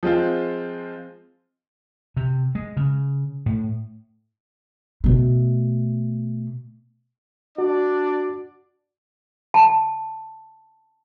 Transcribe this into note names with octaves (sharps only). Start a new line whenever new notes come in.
F3 G#3 C4 F4
C3
G#3
C#3
A2
B2 A3
D4 F#4 D5
A5